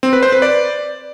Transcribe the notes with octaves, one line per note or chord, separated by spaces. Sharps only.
C4
B4
C5
B4
D5